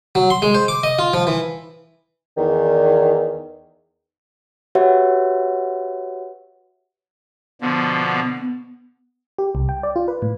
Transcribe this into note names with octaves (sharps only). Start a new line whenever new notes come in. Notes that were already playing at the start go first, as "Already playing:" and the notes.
F#3
C6
G#3
C5
D6
D#5
F4
F3
E3
E2 D#3
F#4 G4 B4 C#5 E5 F#5
B2 D3 F3 B3
G4
C2
G5
D5
F4
B4
A2